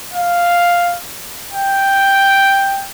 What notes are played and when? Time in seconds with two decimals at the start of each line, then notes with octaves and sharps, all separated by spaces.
0.14 F5
1.52 G5